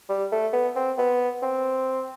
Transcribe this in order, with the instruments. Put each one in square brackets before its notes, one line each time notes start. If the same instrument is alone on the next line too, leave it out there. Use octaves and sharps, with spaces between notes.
[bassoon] G3
A3
B3
C4
B3
C4